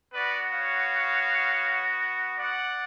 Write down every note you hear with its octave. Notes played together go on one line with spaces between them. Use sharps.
B3 F#4 B4 D5
C#5 F5
D5 F#5